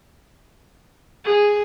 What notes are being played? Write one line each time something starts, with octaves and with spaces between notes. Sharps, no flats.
G#4